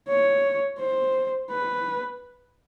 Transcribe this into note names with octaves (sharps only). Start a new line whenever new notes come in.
C#5
C5
B4